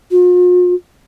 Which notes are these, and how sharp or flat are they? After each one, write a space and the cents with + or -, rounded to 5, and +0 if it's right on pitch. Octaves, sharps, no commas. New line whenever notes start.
F4 +45